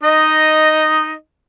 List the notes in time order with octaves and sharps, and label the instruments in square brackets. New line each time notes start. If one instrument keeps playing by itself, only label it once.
[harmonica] D#4 D#5